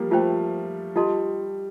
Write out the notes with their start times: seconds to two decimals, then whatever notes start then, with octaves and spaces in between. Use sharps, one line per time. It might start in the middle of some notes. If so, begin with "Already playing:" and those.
Already playing: F3 G3 A#3
0.11 A3 F4 C5 G5
0.96 G3 F4 A4 D#5 A5 C6